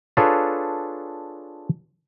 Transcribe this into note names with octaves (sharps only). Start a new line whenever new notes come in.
D4 F4 G#4 A4 B4 C#5